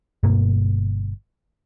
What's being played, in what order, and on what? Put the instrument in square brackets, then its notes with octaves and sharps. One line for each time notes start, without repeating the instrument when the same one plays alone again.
[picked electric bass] G1 G2 B2 A#3